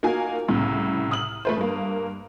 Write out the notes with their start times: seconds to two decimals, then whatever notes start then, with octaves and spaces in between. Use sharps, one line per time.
0.03 A#3 D#4 F4 F#4 A#4 G#5
0.48 C2 A2 C#3
1.11 D#6 F6 F#7
1.45 A3 B4 C5
1.57 G2 A#3